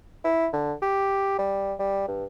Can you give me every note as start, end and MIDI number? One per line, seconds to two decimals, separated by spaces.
0.24 0.48 64
0.53 0.73 50
0.82 1.34 67
1.38 1.74 55
1.79 2.07 55
2.08 2.25 43